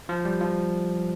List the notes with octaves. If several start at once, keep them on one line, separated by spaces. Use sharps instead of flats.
F3
G3
F3